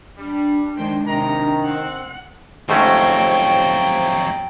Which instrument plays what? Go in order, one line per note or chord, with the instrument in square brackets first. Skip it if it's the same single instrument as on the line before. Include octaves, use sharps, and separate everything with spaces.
[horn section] G3 [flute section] D4
[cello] D#3 G#3 [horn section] C5 G5
[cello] C3 [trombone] D#3 [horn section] A#5
[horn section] C4 [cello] F#5
[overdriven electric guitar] F2 F#3 [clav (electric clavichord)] G#2 A3 C#4 [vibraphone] G4 C5 [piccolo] G5